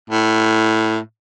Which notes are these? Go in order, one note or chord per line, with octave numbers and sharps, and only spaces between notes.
A2